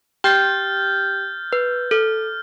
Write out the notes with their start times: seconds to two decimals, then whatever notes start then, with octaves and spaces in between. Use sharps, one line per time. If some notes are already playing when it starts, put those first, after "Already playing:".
0.24 G4 G5 F6 G6 A6
1.53 B4
1.91 A4 F6